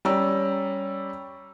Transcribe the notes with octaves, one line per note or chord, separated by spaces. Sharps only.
G3 C#4 D5 A#5 E6